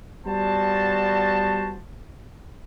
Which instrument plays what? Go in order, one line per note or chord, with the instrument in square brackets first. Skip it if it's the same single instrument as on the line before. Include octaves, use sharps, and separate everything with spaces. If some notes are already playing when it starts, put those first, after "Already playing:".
[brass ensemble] G3 B3 F#4 C5 A5